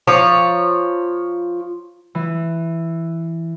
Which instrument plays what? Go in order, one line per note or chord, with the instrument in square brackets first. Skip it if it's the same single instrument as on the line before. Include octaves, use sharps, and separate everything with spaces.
[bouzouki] F3 C#5 D5 A#5
[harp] E3